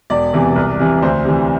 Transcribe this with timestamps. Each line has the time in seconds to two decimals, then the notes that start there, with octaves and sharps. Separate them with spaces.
0.10 E1 D5
0.33 E2 C3 E3
0.56 C2
0.79 C3 E3
1.02 D2 C5
1.25 C3 E3